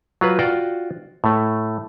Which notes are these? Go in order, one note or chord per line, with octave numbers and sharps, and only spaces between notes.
F#3 F4 B4
F4 F#4 D5 G5
A2 A3